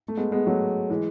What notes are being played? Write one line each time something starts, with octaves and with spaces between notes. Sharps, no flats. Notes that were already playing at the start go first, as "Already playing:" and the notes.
A3
G#3 B3
G#3 B3
F#3 A3
E3 G#3